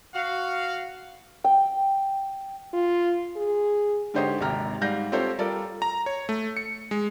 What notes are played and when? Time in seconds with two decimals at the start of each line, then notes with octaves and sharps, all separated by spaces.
0.15 F#4 F5
1.44 G5
2.73 F4
3.36 G#4
4.14 G#2 D3 G4 C5 C#5 D#5
4.40 G#1 D#2 C3 G4 A#5 F6
4.81 G#2 G3 F5 F#5 G6 A#6
5.12 C4 F4 G4 A4 C5 C#5
5.39 G3 F4 A4 A#4 D5
5.82 A#5
6.06 C#5
6.29 A3
6.57 C#7
6.91 G#3